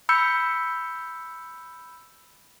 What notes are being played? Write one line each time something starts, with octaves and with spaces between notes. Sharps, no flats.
B5 E6 G6 C#7